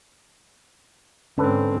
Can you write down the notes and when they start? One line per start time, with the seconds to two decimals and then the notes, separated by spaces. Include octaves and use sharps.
1.38 G#2 D3 C4 C#4 A4 B4